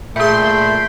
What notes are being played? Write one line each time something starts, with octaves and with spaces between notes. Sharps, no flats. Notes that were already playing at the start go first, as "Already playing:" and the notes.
A#2 A3 G#4 E5 G5 B5 C6